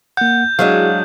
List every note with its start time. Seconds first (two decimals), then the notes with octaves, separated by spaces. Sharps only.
0.17 A#3 F#5 G6
0.59 F#3 G#3 D4 E4 F#4 G#4 F5